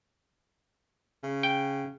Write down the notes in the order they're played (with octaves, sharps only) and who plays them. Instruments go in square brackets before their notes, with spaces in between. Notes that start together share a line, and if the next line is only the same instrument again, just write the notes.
[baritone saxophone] C#3
[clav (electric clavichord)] G5